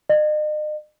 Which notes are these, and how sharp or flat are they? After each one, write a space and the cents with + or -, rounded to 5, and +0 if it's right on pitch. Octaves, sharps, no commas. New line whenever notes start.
D#5 -40